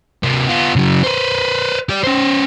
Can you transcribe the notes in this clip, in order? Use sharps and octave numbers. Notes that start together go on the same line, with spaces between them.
C3 A#3
B3 F4
C#3 F#3
B4 C5
G4 D5
C#4 C5